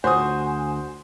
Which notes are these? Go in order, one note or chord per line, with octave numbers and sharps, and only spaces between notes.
D2 F#4 C5 G#5 D#6